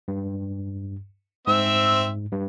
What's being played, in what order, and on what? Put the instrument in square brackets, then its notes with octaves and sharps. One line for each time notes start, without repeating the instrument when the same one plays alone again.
[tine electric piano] G2
[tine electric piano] G#2 [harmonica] C4 E5 E6
[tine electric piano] G2